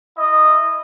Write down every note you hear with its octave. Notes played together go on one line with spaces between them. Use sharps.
E4 D#5